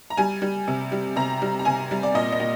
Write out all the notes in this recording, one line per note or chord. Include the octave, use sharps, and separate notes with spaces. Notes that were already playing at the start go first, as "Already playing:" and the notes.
A#5
G3 G#5
G3
C3
G3
C3 A#5
G3
A#5
C3 G#5
G3
D5
A#2 D#5
D#5
A#2